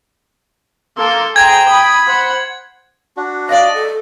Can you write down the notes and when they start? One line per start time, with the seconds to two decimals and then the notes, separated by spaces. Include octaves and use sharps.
0.98 A#3 A4 C6
1.36 G#4 C5 G5 A#5 G#6
1.69 B5 D#6
2.08 C5 F#5
3.17 D4 F#4
3.49 D5 D#5 F5
3.74 A4